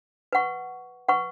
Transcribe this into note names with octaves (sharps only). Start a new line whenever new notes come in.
B4 F#5 C#6
B4 F#5 C#6